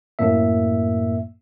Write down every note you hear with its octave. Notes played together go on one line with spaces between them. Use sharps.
F#2 A2 A#3 E5